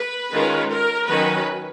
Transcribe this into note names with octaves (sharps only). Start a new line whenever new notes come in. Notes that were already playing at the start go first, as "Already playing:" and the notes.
Already playing: B4
D#3 G#3 C#4 F4
A#4
D#3 F#3 C#4 B4